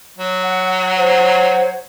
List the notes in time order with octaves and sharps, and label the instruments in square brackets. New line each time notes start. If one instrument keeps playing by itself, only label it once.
[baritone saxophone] F#3
[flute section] F#5
C5 C#5 F#5